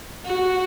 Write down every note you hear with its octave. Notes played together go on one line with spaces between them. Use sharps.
F#4